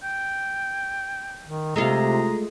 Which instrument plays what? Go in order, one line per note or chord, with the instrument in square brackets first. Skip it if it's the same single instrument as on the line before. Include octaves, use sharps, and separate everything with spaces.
[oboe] G5
[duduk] D#3
[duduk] C3 [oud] G#3 A3 F4 [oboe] A#5